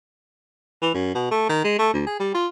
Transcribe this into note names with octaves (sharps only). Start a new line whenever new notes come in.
E3
F#2
B2
A3
D#3
G#3
A3
D2
G#4
G3
F4